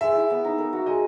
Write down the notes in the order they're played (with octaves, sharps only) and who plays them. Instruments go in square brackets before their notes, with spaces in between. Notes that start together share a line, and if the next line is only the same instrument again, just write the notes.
[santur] G#3 [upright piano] E5
[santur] E4
B3
D#4
A#4
F#4
[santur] G#3 [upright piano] D#5